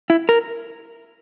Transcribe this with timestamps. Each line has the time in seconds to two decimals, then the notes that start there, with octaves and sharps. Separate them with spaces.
0.10 E4
0.29 A#4